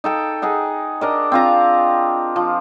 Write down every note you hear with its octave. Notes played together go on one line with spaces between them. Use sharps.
D#4 A4 G5
D#4 G#4 F#5
D4 A#4 D#5
C4 F4 A#5
F3